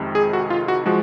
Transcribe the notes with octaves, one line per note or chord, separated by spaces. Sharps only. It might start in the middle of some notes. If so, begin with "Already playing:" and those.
Already playing: F2 C3 D#3 G#3
G#4
F#4
F4
F#4
F3 G#3 F#4